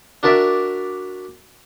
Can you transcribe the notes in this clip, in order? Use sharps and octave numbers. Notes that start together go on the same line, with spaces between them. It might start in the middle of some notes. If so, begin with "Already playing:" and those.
D4 F#4 A#4 D5 E5